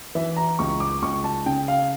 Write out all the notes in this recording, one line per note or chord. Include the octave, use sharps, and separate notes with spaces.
E3 E5
A#5
C#2 C#6
D6
C#2 C#6
A5
C#3 G5
F5